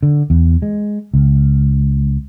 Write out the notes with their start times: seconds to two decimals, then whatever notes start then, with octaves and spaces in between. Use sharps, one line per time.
0.03 D3
0.30 E2
0.62 G#3
1.14 C#2